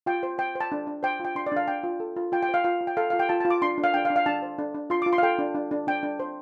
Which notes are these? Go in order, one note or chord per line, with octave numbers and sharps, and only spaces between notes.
F4 G5
C5
C5 G5
C5
A5
D4
D4
C5 G5
F4
G5
D4 C6
D5
D4 F5
D4 G5
F4
A4
F4
F4 G5
G5
C5
F5
F4 F5
F4
G5
A4 F5
F4 F5
G5
F4 A5
F4 A5
D6
D4 C6
D4
F5
D4 G5
F5
D4
F5
D4 A5
C5
D4
D4
F4 C6
F4 D6
C6
F5
A4 G5
D4
D4
D4
D4 G5
D4
C5